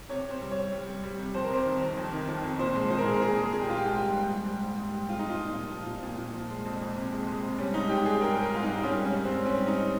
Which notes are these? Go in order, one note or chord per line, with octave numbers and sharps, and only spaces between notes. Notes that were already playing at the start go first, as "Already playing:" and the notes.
C3 C#5
C3 C5
G3
C#5
G3
G3
G3
G3
C3
F2 C5
A#4
C3 C5
D#3
C3
F2
D#3
F2
F2
A#2 C5
G#3
A#2 C5
A#4
A#2 G#4
A#4
A#2 G#4
G#3
A#2 G#4
G4
G#3 F4
G4
G#2
G3
G#2
G3
G3
G#2
G#2
G3
G#3 F4
D#4
F3 F4
A#2
A#2
F3
A#2
A#2
A#2
F3
G#3
F2
F2
C3
G#3
G#3
C3
G3 C#4
G#2 D#4
G#2 G4
G#2 G#4
G3 A#4
G3 A#4
G#2 F4
D#4
G#2
G3 C#4
G#2
C#4
G#2
C4
G#2
G3 C#4
G3
D#4